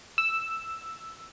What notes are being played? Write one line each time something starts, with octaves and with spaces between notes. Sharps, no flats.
E6